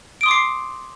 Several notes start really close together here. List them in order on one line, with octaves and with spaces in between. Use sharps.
D7 D#6 C6 D6 C7